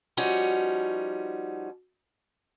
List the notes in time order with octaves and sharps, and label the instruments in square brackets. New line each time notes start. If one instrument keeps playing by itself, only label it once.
[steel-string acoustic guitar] F3 G3 C#4 D#4 F#4